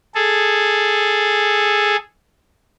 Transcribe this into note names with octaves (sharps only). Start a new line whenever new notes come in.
G#4 A4